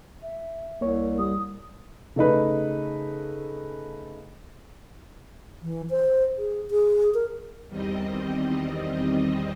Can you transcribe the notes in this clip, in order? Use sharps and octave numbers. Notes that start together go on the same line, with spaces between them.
E5
C2 A#3 C#5
G3 D#6
C#3 A3 D#4 B4
E3
C5
G#4
G#4
A#4
E2 D#3 G3 C4 D#5